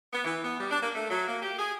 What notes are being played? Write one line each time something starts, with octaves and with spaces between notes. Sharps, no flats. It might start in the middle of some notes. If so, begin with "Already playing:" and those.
B3
E3
B3
G3
D4
A#3
A3
F#3
A#3
G4
G#4